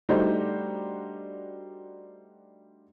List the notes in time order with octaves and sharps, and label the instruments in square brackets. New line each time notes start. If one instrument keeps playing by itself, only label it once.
[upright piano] G3 A3 D4 D#4 F#4 C5